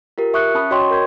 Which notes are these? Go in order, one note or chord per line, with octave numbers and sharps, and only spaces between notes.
F4 G4 A#4
E5 C#6 D#6 F#6 C7 C#7
C#4 A5 B5 D#6
F#4 C#5 D#5 G5 C6 C#6
A#4 G6 G#6